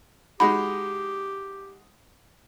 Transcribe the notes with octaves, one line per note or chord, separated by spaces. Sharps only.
G#3 D#4 F#4 G4 B5